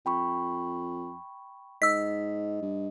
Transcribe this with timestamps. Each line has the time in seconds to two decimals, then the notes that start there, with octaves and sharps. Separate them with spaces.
0.06 F2 G5 B5 C#6
1.82 G#2 D#5 E6 B6
2.62 G2